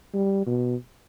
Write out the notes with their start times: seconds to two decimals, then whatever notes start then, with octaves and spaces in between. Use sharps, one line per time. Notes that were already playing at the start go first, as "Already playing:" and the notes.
0.14 G3
0.47 B2